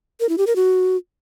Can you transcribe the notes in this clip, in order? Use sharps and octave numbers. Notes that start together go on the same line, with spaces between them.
A#4
E4
G4
A#4
F#4